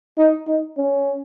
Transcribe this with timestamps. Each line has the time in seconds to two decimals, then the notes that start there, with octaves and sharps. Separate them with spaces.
0.17 D#4
0.47 D#4
0.78 C#4